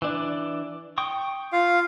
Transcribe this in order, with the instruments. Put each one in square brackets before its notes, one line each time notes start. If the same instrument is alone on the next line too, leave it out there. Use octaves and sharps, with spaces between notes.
[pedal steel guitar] E3 D4
G5 C#6 D#6
[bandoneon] F4 F5